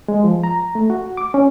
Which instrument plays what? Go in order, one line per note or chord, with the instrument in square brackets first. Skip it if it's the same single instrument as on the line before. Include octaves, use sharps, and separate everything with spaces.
[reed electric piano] G#3
F3
A#5
A3
F#4
D6
C#4